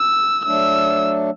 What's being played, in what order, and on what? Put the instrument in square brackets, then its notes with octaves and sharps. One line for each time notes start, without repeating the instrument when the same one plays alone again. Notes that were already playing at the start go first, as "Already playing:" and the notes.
Already playing: [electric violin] E6
[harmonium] F#3 A3 D4 [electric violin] E6